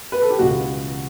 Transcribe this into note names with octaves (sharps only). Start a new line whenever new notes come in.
B4
A4
G4
C#2 B2 F#4